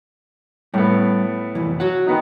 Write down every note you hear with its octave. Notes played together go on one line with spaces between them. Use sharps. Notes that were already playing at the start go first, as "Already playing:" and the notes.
A2 G3 A3 B3
C2 F2 E3
F#4 C#5 F#5
D#3 B3 D#4